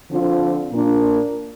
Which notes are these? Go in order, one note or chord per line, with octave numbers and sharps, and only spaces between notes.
D3 F3 C4 F4
A#2 A#3 D4 F4